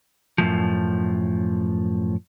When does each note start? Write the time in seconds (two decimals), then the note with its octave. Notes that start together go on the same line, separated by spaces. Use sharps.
0.38 F#2 A2 F3